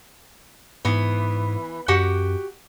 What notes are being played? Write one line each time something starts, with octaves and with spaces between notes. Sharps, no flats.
G#2 E3 B3
F#2 F#4 G4 F#5